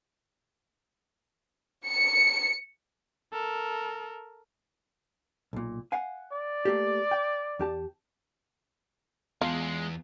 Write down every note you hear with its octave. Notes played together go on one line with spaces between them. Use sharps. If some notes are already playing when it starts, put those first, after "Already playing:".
C#7
A4 A#4
B1 A#2
F5 F#5 G#5
D5
A3 A#3 G4
G5
E2 G4 A5
E2 G#3 B3 F4